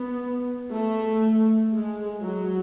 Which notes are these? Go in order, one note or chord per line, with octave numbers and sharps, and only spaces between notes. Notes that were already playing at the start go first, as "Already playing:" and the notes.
Already playing: B3
A3
G#3
F#3